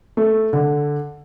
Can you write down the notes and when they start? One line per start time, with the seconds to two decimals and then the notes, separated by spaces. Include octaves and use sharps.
0.17 A3
0.53 D3